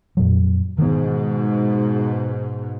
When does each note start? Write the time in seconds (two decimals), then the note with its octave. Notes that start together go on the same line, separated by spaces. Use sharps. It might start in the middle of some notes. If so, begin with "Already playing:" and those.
0.17 F2 A#2 F#3
0.78 G#2 B2 D#3 B3